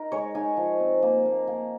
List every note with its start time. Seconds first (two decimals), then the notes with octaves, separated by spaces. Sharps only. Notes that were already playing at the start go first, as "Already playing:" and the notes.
Already playing: D#4 A#4
0.12 G#3 C#5
0.35 D#4 G#5
0.57 F3
0.80 C4
1.02 A#3
1.25 A#3
1.48 A#3